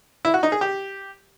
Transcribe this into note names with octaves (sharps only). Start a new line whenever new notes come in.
E4
F#4
D#4
G#4
G4